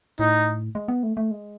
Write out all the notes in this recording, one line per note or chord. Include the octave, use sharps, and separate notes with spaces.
A2 D#4
G#3
B3
A3
A3
G#3